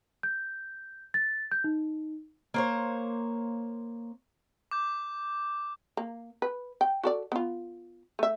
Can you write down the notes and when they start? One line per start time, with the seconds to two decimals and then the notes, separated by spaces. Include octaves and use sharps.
0.23 G6
1.14 A6
1.52 G6
1.64 D#4
2.54 A#3 C5 C#5
4.71 D6 G6
5.97 A#3
6.42 B4
6.81 G5
7.04 F#4 A4 D5
7.32 B3 F4
8.19 A3 E5